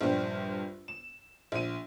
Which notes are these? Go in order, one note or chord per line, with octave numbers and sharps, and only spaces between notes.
A#1 G2 G3 G4 C5
E7
A#1 D#7